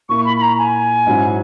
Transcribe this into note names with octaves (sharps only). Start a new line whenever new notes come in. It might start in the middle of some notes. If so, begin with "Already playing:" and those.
A#2 A#3 E4 C#6
B5
B5
A#5
G#5
G#2 F#3 C#4 E4